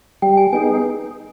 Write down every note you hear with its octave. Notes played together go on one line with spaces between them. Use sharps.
G3 G5
G#5
B3 D#4 G#4 G#5